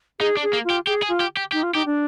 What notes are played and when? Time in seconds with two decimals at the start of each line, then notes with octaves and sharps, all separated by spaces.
0.20 D#4 G#4
0.37 D4
0.43 G#4
0.53 A#3
0.64 F4
0.70 G4
0.87 G4 G#4
1.03 G#4
1.09 F4
1.20 G4
1.37 G4
1.52 D#4 G4
1.63 F4
1.74 D#4 G4
1.86 D4